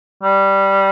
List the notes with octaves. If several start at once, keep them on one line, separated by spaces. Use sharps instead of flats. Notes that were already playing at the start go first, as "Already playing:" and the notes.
G3